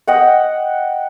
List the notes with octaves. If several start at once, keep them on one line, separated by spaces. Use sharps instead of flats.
D#5 F#5 G5